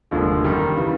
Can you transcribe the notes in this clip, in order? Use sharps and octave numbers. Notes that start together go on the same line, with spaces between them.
F1 D#2 D3 F3 G#3
F#2 D#3 G3
C#3 E3